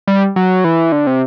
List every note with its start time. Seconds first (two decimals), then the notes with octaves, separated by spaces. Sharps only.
0.07 G3
0.36 F#3
0.64 E3
0.92 D3
1.07 C3